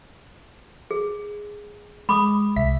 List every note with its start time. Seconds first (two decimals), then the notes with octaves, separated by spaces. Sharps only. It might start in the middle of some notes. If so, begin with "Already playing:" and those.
0.91 G#4
2.09 G#3 B5 D6 D#6
2.56 C2 E5 B6